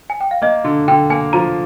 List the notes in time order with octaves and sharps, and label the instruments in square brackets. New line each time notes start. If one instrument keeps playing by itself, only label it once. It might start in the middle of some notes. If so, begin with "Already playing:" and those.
[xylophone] G#5
G5
F5
[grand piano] A#3 [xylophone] D#5
[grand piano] D3
[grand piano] D3 [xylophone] G5
[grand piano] A#3 [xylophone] G#5
[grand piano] F3 [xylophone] A#5